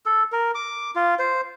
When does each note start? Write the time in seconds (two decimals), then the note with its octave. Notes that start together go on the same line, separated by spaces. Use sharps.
0.06 A4
0.32 A#4
0.55 D6
0.96 F4
1.19 C5